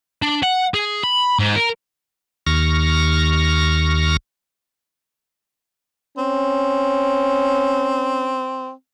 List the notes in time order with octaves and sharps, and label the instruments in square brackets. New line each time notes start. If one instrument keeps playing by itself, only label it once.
[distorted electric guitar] D4
F#5
G#4
B5
G#2
A#4
[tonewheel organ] D#2 C#6 F6 A#6
[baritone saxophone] C4 [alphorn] C#4